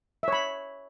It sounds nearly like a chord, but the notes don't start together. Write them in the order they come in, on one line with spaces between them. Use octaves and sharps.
E5 C#5 B5